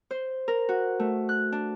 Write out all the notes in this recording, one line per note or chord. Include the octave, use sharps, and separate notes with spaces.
C5
A#4
F#4
A3
F#6
D4